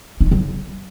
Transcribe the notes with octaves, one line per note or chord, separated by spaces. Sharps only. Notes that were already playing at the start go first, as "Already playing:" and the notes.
D#4
A3
F#3